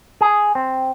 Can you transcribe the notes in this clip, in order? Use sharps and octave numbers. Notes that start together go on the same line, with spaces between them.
G#4
C4